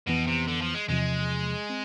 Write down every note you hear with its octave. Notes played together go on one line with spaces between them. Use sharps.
F2 B2 E3 B3
C3
D3
F3
G#3
E2 C3 F3 G#3
C4